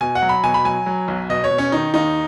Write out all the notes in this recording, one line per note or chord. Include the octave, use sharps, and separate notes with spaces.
B2 G#5
F#5
F#3
B5
B2 G#5
B5
F#3 G#5
F#3
B1
B2 D#5
C#5
B2
C#4
D#3 D#4
D#2 D#4